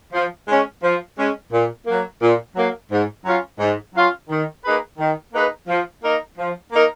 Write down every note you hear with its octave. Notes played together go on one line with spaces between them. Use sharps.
F3
G#3 C#4
F3
G#3 C#4
A#2
F#3 A#3
A#2
F#3 A#3
G#2
F#3 C#4 F4
G#2
F#3 C#4 F4
D#3
A#3 D#4 G#4 B4
D#3
A#3 D#4 G#4 B4
F3
A#3 D#4 A#4
F3
A#3 D#4 A#4